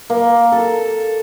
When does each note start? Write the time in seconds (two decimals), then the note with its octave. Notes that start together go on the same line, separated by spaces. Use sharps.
0.10 A#3
0.52 A4